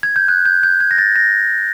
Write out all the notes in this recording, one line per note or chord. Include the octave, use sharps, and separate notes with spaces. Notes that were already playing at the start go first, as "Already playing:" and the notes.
G#6
G6
F#6
G6
G6
G#6
A#6
A6
A#6